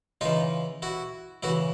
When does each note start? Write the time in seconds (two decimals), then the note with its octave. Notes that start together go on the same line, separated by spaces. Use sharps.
0.21 C#3 E3 D#4 F4
0.82 E4 F#4
1.43 C#3 E3 E4 F#4